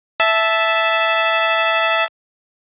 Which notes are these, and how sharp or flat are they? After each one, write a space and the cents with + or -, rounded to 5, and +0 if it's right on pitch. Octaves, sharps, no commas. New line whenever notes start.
E5 +0 A5 -10